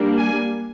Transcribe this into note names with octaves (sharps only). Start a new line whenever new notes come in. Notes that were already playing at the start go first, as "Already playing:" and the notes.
Already playing: G3 A#3 D4
G#5